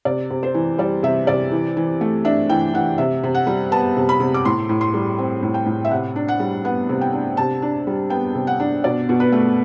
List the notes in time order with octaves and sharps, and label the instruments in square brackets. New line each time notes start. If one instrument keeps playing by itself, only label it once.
[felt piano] C3 D5
C3
C5
E3
G3 D5
C3 E5
C3 D5
E3
E3
A3
D4 E5
E3 G5
E3 F#5
C3 E5
C3
F#5
G3
B3 A5
C3
B5
C3
D6
A2 C6
A2
C6
G3
C4
A2
G5
A2
E5
C3 F#5
D4
F#5
G3
B3 F#5
C3
G5
D4
C3 A5
D4
G3
B3 G5
C3
F#5
D4
B2 D5
B2
B4
A3